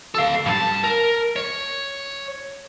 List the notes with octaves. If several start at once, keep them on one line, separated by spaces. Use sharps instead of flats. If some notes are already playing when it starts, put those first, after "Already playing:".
A4 F5
G2 A5
A#4
C#5